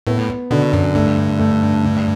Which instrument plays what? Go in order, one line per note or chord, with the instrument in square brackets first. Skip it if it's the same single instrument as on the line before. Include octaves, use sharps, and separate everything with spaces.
[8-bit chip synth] A2 [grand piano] B3
[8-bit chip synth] B2 [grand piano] D3
[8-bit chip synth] F#2
[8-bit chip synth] G2 [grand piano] A3
[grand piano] A3
D3